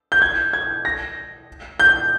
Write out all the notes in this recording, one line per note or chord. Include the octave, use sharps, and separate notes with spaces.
G6
G#6
G#6
A#6
G6